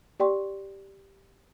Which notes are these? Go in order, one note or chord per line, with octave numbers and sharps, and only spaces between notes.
G4 D5 G5 C6 C#6